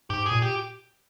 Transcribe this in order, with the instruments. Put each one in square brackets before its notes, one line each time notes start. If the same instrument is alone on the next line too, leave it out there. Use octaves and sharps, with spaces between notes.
[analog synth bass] G#2 [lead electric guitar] G4
[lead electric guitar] G#4
[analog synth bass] A#2
[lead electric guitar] G4